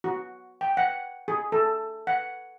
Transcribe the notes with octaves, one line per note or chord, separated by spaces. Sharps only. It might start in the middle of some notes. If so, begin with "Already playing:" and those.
F#4
G5
F#5
G#4
A4
F#5